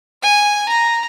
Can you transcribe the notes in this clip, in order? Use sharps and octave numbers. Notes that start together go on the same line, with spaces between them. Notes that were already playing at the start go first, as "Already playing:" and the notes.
G#5
A#5